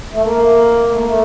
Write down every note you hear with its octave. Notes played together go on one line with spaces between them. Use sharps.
A3
A#3
A3
A#3
A3